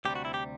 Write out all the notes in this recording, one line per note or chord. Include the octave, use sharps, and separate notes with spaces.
D2 C3 G3 G4
F#4
E4
G4